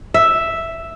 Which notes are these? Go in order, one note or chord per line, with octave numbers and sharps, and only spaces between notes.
E5